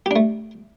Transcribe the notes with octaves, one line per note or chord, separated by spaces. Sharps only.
A3 D4 G4